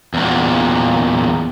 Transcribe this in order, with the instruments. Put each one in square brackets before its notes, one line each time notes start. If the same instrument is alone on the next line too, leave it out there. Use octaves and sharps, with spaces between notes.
[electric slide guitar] E2 A#2